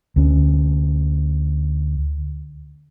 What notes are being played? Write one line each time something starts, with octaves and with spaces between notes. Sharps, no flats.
D2 C#4